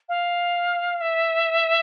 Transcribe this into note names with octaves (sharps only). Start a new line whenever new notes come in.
F5
E5